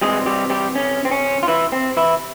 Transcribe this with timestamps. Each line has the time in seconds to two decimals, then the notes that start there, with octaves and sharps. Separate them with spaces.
0.01 C3 E3 G3 G#3 C4 G#4
0.26 G3 G4
0.50 G3 G4
0.75 C#4
1.05 C4
1.11 C#4
1.43 F4
1.48 E3 E4
1.72 C4
1.97 E3 E4